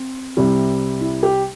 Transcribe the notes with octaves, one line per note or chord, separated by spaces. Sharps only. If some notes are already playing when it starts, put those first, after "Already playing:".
Already playing: C4
C2 C3 G3
E4
G4